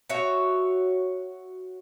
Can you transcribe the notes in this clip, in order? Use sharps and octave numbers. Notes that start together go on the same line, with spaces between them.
F#4 C#5 E5